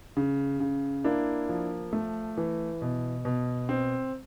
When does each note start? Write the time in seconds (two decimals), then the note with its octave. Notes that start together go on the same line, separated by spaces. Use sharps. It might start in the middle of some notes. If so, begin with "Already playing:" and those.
0.17 C#3
0.60 C#3
1.04 A#3 D4 E4
1.49 F3
1.93 A3
2.37 E3
2.82 B2
3.25 B2
3.69 C4